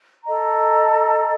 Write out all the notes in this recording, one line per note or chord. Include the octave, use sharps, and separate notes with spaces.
A4 D#5 A#5